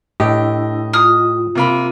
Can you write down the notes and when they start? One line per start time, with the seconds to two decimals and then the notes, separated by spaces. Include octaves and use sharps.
0.20 A2 D4 E4 G4 D#5 E6
0.93 F4 D#6 F6
1.55 C3 A#3 B5